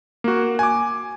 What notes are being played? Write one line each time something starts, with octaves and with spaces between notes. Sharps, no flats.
A#3 F#4
G#5 D6